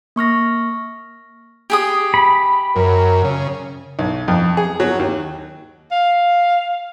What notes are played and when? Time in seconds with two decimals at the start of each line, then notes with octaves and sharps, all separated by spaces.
0.16 A#3 C#6 F6 A#6
1.70 G4 G#4 D#6
2.14 B5
2.76 F#2 A#4
3.24 C#3
3.99 B1
4.28 F2
4.57 G#4
4.80 F#3
4.99 D#2
5.92 F5